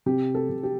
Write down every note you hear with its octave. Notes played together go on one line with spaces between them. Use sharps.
C3 G4
A4
C3
G4